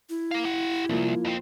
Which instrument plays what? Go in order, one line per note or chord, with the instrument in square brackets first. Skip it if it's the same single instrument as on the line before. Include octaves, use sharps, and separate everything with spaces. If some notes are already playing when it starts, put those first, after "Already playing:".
[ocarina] E4
[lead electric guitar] A#3 F5
G4 F#5
[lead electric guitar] C2 [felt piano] F3 A#3 F4
[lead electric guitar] F2 C4